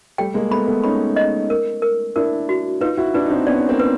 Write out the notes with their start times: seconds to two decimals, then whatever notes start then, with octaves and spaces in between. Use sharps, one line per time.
0.18 G3 A3 G5
0.34 G#3 A#3
0.51 A3 B3 B5
0.67 A3 B3
0.84 C#4 D#4 B5
1.16 D#5
1.50 A#4
1.82 A#4
2.16 D4 E4 A#4
2.49 F#4
2.81 D#4 F4 B4
2.97 E4 F#4
3.14 D4 E4 B4
3.26 D#4
3.30 C4 D4
3.47 B3 C#4 D5
3.69 A#3 C4
3.79 B4